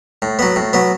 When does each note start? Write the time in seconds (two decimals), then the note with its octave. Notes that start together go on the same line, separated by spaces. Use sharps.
0.22 A2
0.39 F#3 B3
0.56 A2
0.73 F#3 B3